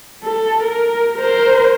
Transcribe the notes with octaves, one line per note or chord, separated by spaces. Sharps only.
A4
A#4
A#4 C5